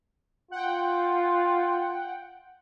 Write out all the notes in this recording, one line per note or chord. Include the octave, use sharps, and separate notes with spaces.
F4 F#5 G5